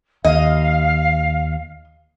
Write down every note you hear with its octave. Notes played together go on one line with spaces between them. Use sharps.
D#2 D#5 F5